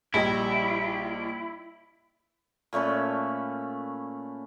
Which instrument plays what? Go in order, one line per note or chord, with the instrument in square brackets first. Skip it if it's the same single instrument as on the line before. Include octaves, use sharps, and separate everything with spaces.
[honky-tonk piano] A#1 G3 D#5 [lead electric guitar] E4
[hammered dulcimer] A#2 A3 C#4 B4